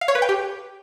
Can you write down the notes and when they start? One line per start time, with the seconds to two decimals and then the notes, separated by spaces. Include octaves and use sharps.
0.01 F5
0.08 C#5
0.15 B4
0.22 G5
0.29 G4